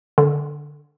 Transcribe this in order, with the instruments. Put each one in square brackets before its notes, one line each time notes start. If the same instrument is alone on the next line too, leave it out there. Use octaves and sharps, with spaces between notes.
[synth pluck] D3